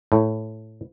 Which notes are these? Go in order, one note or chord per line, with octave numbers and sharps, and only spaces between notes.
A2